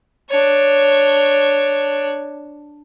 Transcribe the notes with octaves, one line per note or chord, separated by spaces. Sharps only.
D4 C#5